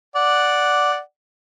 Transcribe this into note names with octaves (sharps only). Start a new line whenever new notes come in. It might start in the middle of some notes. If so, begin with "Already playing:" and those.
D5 F#5